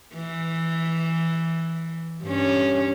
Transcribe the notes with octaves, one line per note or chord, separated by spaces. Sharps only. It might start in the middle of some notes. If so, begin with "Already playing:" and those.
E3
G2 C#4